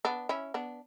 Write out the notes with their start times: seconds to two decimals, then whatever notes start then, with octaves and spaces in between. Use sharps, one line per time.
0.05 B3 D4
0.29 C#4 E4
0.54 B3 D4